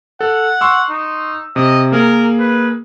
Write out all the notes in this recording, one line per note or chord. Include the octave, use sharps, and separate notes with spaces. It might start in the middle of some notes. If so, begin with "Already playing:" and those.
A4 F#5
C6 C#6 E6
D#4
C3 D#5
A#3 G#4 A#4
B4